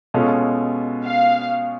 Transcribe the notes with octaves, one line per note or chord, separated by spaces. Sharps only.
B2 G#3 C#4 F4 A4
F5